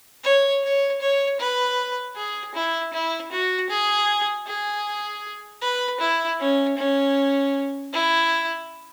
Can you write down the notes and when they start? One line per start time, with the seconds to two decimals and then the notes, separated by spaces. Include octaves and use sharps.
0.24 C#5
0.64 C#5
1.01 C#5
1.40 B4
2.16 G#4
2.55 E4
2.93 E4
3.32 F#4
3.70 G#4
4.47 G#4
5.62 B4
6.00 E4
6.40 C#4
6.77 C#4
7.93 E4